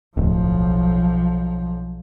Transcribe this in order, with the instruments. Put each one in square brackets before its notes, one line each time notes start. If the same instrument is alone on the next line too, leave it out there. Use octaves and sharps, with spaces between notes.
[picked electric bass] D1 [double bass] B1 F3